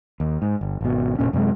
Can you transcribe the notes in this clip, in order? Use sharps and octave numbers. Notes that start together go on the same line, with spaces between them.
D#2
G#2
G1
G#1 B2
F1 E2 A#2 C#4
F#2 C3 F3 G#3